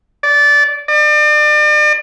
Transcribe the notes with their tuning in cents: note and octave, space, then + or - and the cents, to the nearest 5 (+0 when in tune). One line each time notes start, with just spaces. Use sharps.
D5 -15
D5 +40